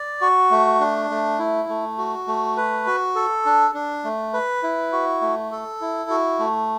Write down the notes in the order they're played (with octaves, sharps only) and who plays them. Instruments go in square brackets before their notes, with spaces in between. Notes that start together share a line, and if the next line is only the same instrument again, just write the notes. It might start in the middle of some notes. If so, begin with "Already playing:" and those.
Already playing: [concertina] D5
F#4
A3
D4
A3
E4
A3
F#4
A3
B4
F#4
A4
D4
D4
A3
B4
E4
F#4
A3
A4
E4
F#4
A3